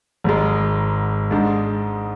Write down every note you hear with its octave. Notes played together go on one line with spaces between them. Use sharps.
G#1 G#2 G#3
G#2 G#3 D4